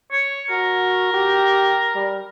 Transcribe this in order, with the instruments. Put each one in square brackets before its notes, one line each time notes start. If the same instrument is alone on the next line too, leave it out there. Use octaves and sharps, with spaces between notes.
[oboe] C#5
[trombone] F#4 [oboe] A#4
[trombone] G4
G3